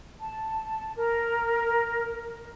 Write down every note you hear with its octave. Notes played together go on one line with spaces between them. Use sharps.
A5
A#4